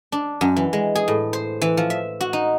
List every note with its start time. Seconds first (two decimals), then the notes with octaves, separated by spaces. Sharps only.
0.12 D4
0.41 F#2
0.57 E3
0.73 G#3
0.95 G#4
1.08 A2
1.33 C5
1.61 E3
1.77 F3
1.90 E5
2.21 F#4
2.33 D#4